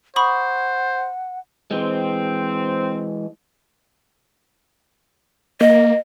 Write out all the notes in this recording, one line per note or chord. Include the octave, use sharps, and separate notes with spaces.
C5 F#5 B5 C#6 D#6
E3 G#3 C4
A#3 D#5